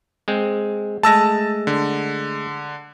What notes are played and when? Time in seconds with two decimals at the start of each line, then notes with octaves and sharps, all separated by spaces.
0.28 G#3 C4
1.03 G#3 A3 A5 E6 A#6
1.67 D3